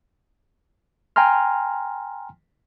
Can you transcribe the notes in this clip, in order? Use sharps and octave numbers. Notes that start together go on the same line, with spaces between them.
G5 G#5 A#5 C6 F6